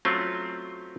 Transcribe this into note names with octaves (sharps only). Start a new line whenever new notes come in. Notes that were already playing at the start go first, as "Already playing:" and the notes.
F#3 A3 C4 C#4 F4